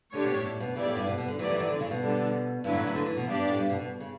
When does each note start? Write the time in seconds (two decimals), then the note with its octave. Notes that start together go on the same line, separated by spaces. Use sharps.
0.14 D3 A3 D4 G4 C#5
0.24 B2
0.35 A2
0.46 A2
0.60 B2
0.76 C#3 B3 E4 G4 D5
0.87 A2
0.97 G2
1.07 B2
1.18 B2
1.28 D3
1.39 E3 F#3 A3 E4 G4 D5
1.50 E3
1.60 E3
1.71 D3
1.80 C#3
1.91 B2
2.01 D3 G3 D4 A4
2.64 G2 D3 F#3 A3 E4 B4
2.74 A2
2.85 C#3
2.95 D3
3.06 E3
3.17 B2
3.27 G2 B3 D4 G4 D5
3.38 G2
3.48 A2
3.58 G2
3.69 B2
3.80 B2
4.00 C#3